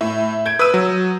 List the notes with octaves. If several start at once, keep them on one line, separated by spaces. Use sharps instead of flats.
A2 E5
G6 G#6 D7
B4 D#6 E6 D#7
F#3